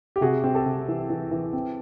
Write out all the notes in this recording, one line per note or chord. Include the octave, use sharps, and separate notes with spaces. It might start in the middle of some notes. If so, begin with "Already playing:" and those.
G4
C3 F#4 G#4
C4
G4 A4
C3
E3
E3
E3
C4